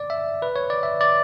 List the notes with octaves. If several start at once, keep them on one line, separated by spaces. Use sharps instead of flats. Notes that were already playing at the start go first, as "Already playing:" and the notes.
Already playing: D5
E5
B4
C#5
D5
E5
D5